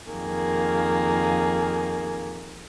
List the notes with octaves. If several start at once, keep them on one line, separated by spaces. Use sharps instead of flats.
F2 D#3 A#3 G#4